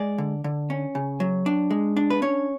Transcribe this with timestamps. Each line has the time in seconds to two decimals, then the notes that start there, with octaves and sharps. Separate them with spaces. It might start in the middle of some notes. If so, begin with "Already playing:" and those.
Already playing: G#3 D5
0.18 D3
0.44 D3
0.70 C#4
0.95 C#3
1.20 F#3
1.46 D4
1.70 G#3
1.97 D4
2.10 B4
2.22 C#4 C#5